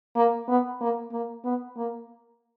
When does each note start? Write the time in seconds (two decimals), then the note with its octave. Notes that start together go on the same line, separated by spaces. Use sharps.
0.16 A#3
0.48 B3
0.81 A#3
1.12 A#3
1.45 B3
1.77 A#3